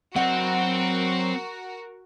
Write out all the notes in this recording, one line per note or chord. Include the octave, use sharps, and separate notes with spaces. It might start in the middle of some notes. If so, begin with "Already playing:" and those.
F#3 C4 F#4 A#4 D#5 F#5